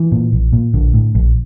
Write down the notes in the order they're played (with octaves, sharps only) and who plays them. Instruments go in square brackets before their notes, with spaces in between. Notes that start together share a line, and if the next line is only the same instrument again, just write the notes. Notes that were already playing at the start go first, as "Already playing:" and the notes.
Already playing: [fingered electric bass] E3
A#2
A#1
A#2
A#1 D3
A2
A#1